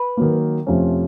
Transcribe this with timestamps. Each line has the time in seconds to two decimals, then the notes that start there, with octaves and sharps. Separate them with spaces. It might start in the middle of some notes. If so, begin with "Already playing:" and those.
Already playing: B4
0.17 D#3 F#3 A#3
0.67 F2 C3 F3 A3 C#4